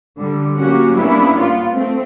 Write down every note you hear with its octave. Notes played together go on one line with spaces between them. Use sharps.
D3 G3
F#3 A#3 C#4 F#4 G4
G3 A#3 B3 C#4 D4 E4
B3 F4
A3 C4